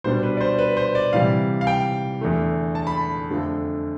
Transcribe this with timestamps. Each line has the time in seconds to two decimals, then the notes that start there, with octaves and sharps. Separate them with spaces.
0.04 B2 G3 B3 D4 C5
0.23 B4
0.37 D5
0.40 C5
0.59 B4
0.77 C5
0.95 D5
1.13 C3 E3 G3 F5
1.61 F5
1.67 G5
2.21 E2 D3 A3
2.75 A5
2.87 B5
2.98 A5
3.30 F2 D3 F3 A3